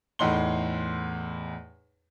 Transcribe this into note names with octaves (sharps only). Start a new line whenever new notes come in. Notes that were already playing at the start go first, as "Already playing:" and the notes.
E2 A2 D#4 F#5 C6 G7